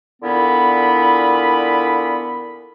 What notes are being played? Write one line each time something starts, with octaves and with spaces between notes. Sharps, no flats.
A#2 D3 B3 E4 B5